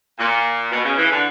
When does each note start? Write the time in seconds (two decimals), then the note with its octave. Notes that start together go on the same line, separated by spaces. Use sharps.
0.18 A#2
0.71 B2
0.84 C#3
0.97 E3
1.11 D3